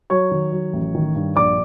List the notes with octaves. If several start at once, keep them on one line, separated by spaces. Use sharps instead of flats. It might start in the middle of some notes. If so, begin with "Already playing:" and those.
F#3 C#5 C#6
D#3
F#3
A1
D#3
G2
A#1 D5 D6